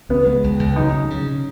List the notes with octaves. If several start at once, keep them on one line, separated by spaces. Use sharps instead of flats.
C#2 B3
G#3
C#2
C#2
F#3 D#4
C#3
C#3
C#3